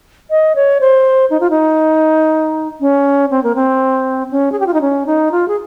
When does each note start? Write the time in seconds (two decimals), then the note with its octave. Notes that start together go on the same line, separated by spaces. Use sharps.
0.30 D#5
0.55 C#5
0.81 C5
1.30 D#4
1.40 F4
1.50 D#4
2.81 C#4
3.31 C4
3.43 A#3
3.55 C4
4.31 C#4
4.52 G#4
4.60 G4
4.67 F4
4.74 D#4
4.81 C#4
5.06 D#4
5.32 F4
5.48 G#4